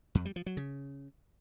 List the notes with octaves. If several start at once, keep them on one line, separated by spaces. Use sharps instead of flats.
F2
G3
F3
F#3
C#3